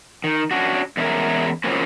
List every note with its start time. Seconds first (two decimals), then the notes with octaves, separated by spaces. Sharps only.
0.24 D#3
0.51 C#4 D4 F#4
0.97 E2 G#3 C#4 D4 E4 A#4
1.64 C#3 F3 F#3 A#3 C4 C#4